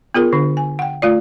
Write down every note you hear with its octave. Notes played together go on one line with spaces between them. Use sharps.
B3 F4 G#4 A#4
D3 D4
G#5
F#5 G5
A3 F4 D5